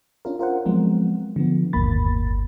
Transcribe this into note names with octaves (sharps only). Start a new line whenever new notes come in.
C#4 D4 F4 A#4
F4 A#4 C5 F#5
F3 F#3 G#3 B3 C4
D3 F3 B3
G1 D#2 A2 A#3 B5 A6